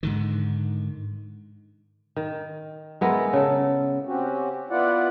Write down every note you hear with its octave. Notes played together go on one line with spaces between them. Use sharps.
G#2 D3 D#3
D#3
G#3 B3 E4 A#4
C#3 A4
C4 C#4 F#4 G4
B3 E4 F4 D5 F#5